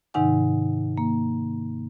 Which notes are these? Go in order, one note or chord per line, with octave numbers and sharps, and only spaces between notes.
G#2 C3 D#3 D#4 F#5 G#5
A#3